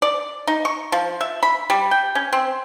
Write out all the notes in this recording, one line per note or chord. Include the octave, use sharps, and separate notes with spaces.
D5
D#4
C#6
F3
E5
B5
G3
G5
C#4
C4